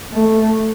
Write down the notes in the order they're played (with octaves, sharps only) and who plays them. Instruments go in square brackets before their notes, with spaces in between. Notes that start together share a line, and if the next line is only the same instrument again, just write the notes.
[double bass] A3